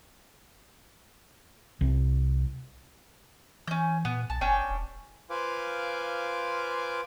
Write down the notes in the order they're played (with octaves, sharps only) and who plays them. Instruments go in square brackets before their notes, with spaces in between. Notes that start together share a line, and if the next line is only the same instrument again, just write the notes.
[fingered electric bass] C2
[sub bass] E3 [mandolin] C#4 G6
[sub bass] A#2 [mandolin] B3
[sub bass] B1 [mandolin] A5
[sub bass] F#1 [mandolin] C#4 D4 G5
[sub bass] E1
[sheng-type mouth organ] F4 B4 C5 F5 G#5 D6